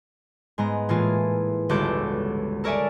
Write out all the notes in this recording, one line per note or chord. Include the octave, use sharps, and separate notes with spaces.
G#2 G#3 B3 A#5
A2 E3 A#3 F4 G#4
G1 C#2 F#4 A4 D6 G6
A4 A#4 C#5 D5 E5 G#5